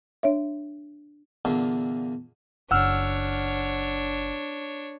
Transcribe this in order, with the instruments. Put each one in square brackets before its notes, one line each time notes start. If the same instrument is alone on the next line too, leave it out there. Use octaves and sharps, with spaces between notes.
[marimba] D4 C#5 E5
[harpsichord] E2 A#2 D3
[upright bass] F#1 [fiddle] D4 C#5 [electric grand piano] F#5 E6 F6